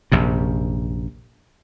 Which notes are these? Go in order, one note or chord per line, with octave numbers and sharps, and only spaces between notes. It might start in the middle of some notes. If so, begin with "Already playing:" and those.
A#1 F#2 C3